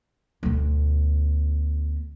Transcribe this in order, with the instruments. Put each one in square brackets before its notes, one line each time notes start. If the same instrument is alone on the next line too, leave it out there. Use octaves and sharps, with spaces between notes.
[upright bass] D2 B2